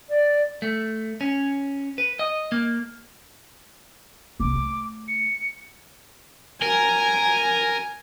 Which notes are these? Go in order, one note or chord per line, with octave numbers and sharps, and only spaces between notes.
D5
A3
C#4
B4
D#5
A#3
C2 A#3 D6
A3
C#7
A#4 G#5